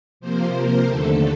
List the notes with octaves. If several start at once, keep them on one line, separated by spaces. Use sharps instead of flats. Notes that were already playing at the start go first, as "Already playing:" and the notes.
C3 F3 A#3 C5
A#4
D#2 D3 A3 A4